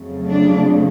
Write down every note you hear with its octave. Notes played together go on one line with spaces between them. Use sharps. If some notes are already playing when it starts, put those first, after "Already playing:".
Already playing: F2 C#3 F#3 A3
D4